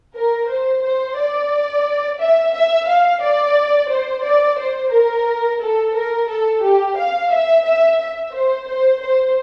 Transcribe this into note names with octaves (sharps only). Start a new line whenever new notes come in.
A#4
C5
C5
D5
E5
E5
F5
D5
C5
D5
C5
A#4
A4
A#4
A4
G4
F5
E5
E5
E5
C5
C5
C5